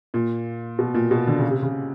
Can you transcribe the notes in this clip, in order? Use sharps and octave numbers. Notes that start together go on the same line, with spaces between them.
A#2
B2
A#2
B2
D3
C#3
C3
C#3